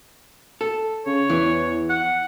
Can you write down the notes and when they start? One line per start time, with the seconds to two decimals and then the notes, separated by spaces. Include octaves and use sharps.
0.61 A4
1.06 C#3 C#5
1.30 E2 E3
1.90 F#5